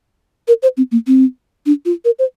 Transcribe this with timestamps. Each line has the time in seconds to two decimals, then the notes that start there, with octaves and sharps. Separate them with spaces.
0.48 A#4
0.63 C5
0.77 C4
0.92 A#3
1.07 C4
1.66 D4
1.85 F4
2.05 A#4
2.19 C5